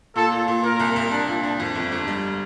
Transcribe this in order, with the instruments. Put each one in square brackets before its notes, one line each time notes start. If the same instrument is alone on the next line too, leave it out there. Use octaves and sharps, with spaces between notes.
[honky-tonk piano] A#2 [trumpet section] A4
[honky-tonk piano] A#2
A#2
[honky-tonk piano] A#2 [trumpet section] A#4
[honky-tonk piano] C2
C2
D4
A#2
D4
F2
G1
G1
G3